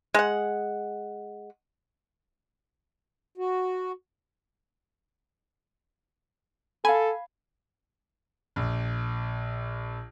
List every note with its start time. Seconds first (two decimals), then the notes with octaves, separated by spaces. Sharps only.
0.14 G#3 F#5
3.38 F#4
6.85 A4 F5 G#5 B5
8.56 A#1